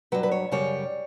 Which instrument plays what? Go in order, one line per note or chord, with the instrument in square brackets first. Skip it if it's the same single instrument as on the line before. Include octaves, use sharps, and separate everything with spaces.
[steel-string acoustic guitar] G2 F#3 B4
B4
C#5
F#2 C#3 G3 C#5